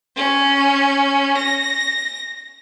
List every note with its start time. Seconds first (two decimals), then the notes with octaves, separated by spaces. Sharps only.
0.16 C#4
1.37 A#6